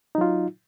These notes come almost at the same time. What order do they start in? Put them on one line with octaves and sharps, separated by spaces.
D#4 F#3 F4